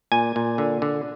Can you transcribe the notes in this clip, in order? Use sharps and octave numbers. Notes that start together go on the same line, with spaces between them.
A#2 G#5
A#2
D3
D3